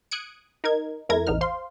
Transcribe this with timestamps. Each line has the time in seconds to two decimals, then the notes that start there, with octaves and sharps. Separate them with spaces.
0.11 D#6 F#6 G#6 C#7 D7
0.64 D#4 A#4 G#6
1.09 F2 A3 E4 A#4 G#6 A#6
1.27 A1 E2 D#4 F6
1.41 C5 F5 C6